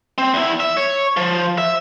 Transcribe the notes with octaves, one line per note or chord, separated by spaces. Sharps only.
C4
E2 E4
E5
C#5
F3
E5